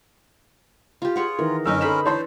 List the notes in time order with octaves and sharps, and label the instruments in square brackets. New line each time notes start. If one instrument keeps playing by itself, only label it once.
[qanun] F4 G4
[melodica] F4 [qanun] G#4 C#5 F#5
[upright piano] D#3 E3 [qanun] A#4
[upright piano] F#1 E6 [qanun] D3 D#4 B4 [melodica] C#4 A#4
[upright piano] A4 E7 [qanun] B4 C5 B5
[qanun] E3 D4 A4 [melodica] C5 [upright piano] C#5 A5 C6